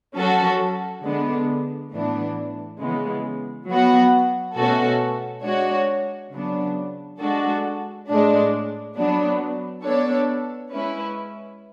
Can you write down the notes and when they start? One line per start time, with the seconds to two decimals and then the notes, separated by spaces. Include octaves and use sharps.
0.16 F#3 C#4 F#4 A4
1.04 D3 G#3 B3 D4
1.91 A2 E3 B3 D4
2.80 C#3 E3 G#3 B3
3.68 F#3 B3 F#4
4.55 B2 A3 C#4 F#4 A4
5.43 G#3 D4 F#4 C#5
6.32 C#3 F#3 B3 D4
7.20 G#3 D4 F#4 A4
8.08 A2 G#3 D4
8.96 F#3 B3 D4
9.84 B3 D4 A4 C#5
10.72 G#3 C#4 E4 B4